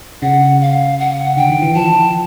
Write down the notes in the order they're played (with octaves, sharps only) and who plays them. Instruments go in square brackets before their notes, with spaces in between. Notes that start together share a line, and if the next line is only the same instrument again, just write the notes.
[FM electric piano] C#3 [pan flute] F#5
[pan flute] F5
F#5
[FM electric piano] D3 [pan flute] G5
[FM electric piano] D#3
E3
[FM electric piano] F3 [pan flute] A5